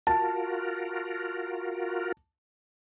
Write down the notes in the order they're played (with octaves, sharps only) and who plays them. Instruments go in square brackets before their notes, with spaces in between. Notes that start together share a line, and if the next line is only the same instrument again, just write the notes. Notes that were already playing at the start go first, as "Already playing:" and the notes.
[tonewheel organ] F4 F#4 A#4 [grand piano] A5